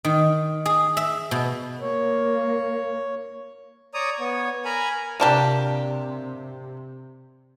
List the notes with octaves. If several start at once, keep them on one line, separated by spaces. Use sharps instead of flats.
D#3
G#4
E5
B2
A#3 C#5
C#5 D5 A#5 D#6
B3 C#5
A#4 G#5 A#5 B5
C3 A#3 D4 G4